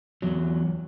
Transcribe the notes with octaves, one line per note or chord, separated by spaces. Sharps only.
E2 F#3